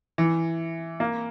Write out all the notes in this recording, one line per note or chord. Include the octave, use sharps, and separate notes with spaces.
E3
A#3